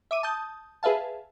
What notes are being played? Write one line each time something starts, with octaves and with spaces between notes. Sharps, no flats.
E5 D6 D#7
A5 D#6 G6
G#4 B4 E5 F5 A5